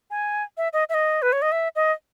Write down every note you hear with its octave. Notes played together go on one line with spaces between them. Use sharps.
G#5
E5
D#5
E5
D#5
B4
C#5
D#5
E5
D#5